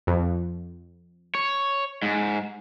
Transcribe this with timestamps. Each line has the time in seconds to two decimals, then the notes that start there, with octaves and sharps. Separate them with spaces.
0.07 F2
1.35 C#5
2.02 G#2